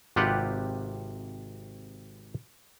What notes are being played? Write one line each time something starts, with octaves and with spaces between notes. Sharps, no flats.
G#1 C3 F4 G4 B4 F#5